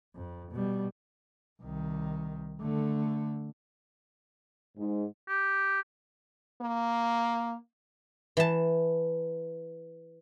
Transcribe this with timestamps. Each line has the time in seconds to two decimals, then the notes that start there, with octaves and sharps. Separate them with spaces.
0.16 F2
0.51 B2 G3
1.61 C2 D#3
2.61 D3 A3
4.77 G#2
5.28 G4
6.61 A#3
8.37 E3 A5